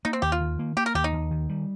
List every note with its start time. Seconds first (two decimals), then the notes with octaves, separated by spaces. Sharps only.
0.05 A#3 D#4
0.13 C4
0.22 D#2 G4
0.32 F4
0.41 D#3
0.59 A#3
0.77 A#3 G4
0.86 A#4
0.95 D#2 G4
1.04 D#4
1.12 D#2
1.31 D#3
1.49 G3